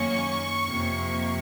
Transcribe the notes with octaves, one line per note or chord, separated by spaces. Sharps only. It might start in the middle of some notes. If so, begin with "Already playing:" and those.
Already playing: F#2 D#3 F#3 A#3 C#4 C#6
F2 C3 F3 A#3